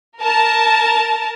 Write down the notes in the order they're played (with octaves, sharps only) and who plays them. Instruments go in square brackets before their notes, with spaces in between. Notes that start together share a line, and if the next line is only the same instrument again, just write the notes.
[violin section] A#4 A5